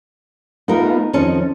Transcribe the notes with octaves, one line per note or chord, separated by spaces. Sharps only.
A3 B3 D#4 F4 A#4
F2 D#3 C4 C#4 A4